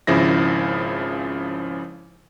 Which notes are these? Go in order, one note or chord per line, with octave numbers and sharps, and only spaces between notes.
G#1 C#3 F3 E4 A#6